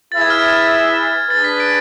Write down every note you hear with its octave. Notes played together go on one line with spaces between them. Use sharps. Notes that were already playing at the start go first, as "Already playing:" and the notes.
E4 G#4 B4 E5 A6
G#6
F6
G#6
D4 G#4 B4 A6
B6
D7